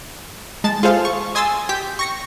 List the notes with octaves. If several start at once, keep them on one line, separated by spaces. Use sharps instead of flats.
G#3 A5 A6
F4 G#4 A4 C5 F5
C#6
D#5 G#5 C6 D#6 E6 A6
G4 G6 B6
C#6 A#6 C#7